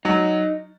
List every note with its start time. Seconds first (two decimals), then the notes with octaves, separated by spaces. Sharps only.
0.05 F#3 D#4